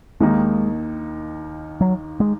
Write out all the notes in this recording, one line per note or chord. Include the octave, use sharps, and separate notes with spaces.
D#2 D#3 G#3 A#3 D#4
F#3
G#3